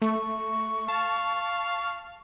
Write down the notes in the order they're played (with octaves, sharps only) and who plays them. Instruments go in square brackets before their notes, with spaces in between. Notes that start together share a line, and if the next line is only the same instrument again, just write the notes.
[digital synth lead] A3 [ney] C#6
[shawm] F5 [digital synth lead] A5